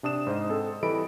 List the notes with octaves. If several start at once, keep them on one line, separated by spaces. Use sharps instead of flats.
C3 D4 D#6 E7
G#2 C5 D#5
C4 G#4 A4
E3 G3 A4 D#5 B5 D7